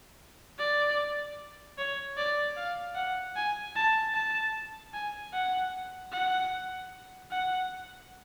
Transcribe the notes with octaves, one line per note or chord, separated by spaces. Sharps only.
D5
C#5
D5
F5
F#5
G#5
A5
A5
G#5
F#5
F#5
F#5